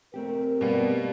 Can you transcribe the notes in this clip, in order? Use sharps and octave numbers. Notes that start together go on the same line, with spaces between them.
A3 C4 G4 A#4
B2 G3 A#3 B3